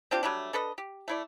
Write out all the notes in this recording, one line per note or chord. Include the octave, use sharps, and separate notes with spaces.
C4 D4 F4 G4
F#3 G3 A3 D4
D4 A4 B4 D#5
G4
A3 E4 D5